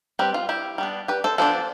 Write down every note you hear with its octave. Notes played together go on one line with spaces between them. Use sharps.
G3 C4 G4 B4
F4
E4 G4
G3 B3 D4
G4 B4
A4 C5
F3 B3 D4 A4 C5